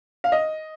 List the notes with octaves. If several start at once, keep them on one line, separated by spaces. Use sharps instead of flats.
F5
D#5